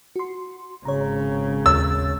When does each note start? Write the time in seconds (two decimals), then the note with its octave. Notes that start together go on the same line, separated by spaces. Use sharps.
0.16 F#4 C6
0.85 G#1 C#3 C#5 A#5
1.66 D#2 C#5 E6 A6